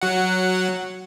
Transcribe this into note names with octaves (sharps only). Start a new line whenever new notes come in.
F#3 F#5